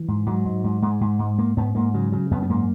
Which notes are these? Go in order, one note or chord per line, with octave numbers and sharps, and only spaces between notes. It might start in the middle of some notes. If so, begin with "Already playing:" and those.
Already playing: E3
G#2
G#2 F#3
G#2
G#2
G#2 G#3
G#2
G#2
G#2 A#3
G#2 B3
G#2 A#3
C#3 F#3
C#3 F#3
F#2 B3
B3
G#2 A#3